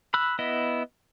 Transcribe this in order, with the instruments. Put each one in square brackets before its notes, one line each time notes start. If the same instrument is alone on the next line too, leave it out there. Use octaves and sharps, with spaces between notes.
[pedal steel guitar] B5 E6 F#6
B3 E4 D#5